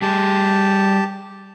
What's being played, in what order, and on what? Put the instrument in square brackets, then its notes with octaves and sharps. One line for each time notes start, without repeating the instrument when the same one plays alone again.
[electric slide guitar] G3 G#4 G#5 [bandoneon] G4 A5